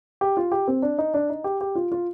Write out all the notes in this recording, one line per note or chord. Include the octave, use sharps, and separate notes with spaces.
G4
F4
G4
C4
D4
D#4
D4
D#4
G4
G4
F4
F4